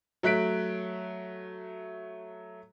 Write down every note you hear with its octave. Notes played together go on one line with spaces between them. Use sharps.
F#3 A3 F#6 B6 D7